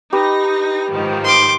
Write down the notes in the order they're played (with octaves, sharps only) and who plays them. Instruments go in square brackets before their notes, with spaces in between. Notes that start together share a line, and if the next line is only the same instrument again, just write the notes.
[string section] D#4 A#6 [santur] G4 B4
[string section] G#2 D#3 F3
[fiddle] C6 D6